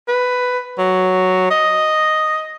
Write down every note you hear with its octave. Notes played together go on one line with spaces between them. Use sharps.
B4
F#3
D#5